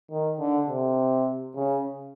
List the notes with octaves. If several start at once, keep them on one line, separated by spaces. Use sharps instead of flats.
D#3
D3
C3
C#3